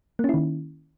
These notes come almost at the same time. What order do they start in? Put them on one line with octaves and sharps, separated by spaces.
A#3 C#4 E4 D#3